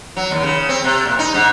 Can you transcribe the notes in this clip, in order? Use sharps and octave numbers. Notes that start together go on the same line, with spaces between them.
F#3
D#2
C#3
C4
C3
A#2
D#4
G#2